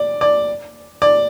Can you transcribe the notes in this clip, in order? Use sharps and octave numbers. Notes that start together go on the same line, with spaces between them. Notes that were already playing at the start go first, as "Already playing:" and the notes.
Already playing: D5
D5
D5